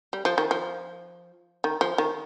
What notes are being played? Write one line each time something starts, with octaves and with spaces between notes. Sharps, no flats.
G3
F3
D#3
F3
D#3
F3
D#3